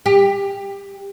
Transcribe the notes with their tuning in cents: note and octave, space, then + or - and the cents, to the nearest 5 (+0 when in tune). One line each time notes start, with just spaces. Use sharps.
G4 +20